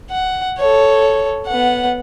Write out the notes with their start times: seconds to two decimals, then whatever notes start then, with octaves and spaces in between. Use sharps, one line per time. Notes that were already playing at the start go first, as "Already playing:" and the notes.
0.11 F#5
0.58 A4 C#5
1.47 B3 F#5